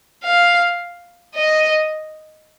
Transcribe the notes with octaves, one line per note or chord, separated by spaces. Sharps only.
F5
D#5